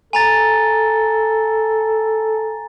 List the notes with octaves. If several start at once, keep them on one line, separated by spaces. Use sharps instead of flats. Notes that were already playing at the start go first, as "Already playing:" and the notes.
A4 G#5 A#5 A6